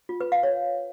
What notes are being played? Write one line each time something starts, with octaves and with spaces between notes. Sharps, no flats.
F4
B4
F5
C#5